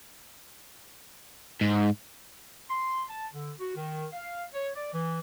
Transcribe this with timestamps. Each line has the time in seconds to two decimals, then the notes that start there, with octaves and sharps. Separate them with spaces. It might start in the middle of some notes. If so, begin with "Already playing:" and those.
1.61 G#2
2.70 C6
3.09 A5
3.33 D3
3.60 F#4
3.76 D#3
4.12 F5
4.54 C#5
4.75 D5
4.92 E3